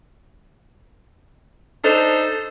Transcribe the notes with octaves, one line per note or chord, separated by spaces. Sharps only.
D4 D#4 A4 C5